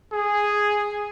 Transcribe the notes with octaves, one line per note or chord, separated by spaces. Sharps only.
G#4